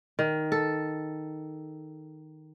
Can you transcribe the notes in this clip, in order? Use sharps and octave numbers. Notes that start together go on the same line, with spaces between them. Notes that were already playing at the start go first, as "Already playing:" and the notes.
D#3
A4